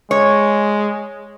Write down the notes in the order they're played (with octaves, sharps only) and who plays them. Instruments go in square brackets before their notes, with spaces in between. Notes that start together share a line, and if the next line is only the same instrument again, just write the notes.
[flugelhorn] G#3 [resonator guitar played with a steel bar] C#5